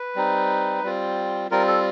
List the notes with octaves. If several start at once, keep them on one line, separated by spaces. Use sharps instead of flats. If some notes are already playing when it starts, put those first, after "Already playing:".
Already playing: B4
G3 C4 D#4
G3 C4 F4
G3 C4 F4 A#4
A4